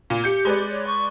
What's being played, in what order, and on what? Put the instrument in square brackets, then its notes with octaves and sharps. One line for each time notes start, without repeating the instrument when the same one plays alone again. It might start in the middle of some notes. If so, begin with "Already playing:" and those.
[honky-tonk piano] A#2
[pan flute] G4 [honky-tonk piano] G6 C#7
[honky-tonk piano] G#3 B4 D5
[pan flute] C#5
C#6